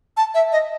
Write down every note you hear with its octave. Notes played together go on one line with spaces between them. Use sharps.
A5
E5
D#5